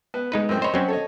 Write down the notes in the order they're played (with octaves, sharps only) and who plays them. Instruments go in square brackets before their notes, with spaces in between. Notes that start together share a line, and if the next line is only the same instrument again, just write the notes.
[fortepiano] B3
[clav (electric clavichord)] G#3 D#4 B4
[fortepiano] F#2 A2 C4
[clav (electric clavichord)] C5 C#5 [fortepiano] D#5 B5
[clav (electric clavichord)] F#3 C4 C#4
[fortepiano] A4 C#5 D#5